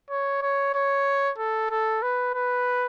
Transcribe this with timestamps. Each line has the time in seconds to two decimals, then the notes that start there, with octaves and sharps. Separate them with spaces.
0.10 C#5
0.42 C#5
0.74 C#5
1.38 A4
1.70 A4
2.02 B4
2.34 B4